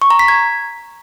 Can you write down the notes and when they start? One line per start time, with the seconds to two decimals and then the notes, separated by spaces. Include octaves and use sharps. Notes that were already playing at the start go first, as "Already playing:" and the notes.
0.02 C#6
0.10 A#5
0.19 B6
0.28 G#6